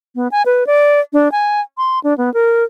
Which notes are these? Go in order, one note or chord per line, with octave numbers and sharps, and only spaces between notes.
B3
G#5
B4
D5
D4
G#5
C6
D4
B3
A#4